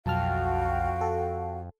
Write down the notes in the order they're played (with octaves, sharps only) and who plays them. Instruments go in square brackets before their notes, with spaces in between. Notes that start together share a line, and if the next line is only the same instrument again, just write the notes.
[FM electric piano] B1 A5 F6 [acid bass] F2 [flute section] F#4 G5 [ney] F5
[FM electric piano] A4